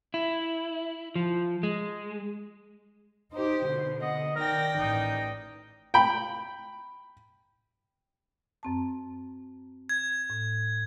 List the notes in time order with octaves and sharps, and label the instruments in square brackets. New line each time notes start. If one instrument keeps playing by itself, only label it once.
[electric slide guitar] E4
F3
G#3
[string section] D#4 G4 [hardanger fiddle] C5
[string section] B2 D3
[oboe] D#5 [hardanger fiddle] F#5
[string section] D#3 A#6 [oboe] A#4 [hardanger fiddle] D5 G5
[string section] A1 [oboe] D#4
[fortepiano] G5 B5
[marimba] F#2 C4 A5
[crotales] G#6
[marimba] A2